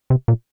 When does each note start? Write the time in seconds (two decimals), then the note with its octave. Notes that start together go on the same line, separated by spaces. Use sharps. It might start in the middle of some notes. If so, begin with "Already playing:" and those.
0.10 C3
0.28 A#2